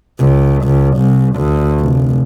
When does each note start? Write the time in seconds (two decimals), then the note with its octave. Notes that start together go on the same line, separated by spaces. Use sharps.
0.20 C#2
0.64 C#2
0.97 C2
1.36 D2
1.80 F1